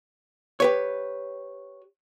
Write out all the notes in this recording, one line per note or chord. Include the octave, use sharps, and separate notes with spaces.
G4 B4 C#5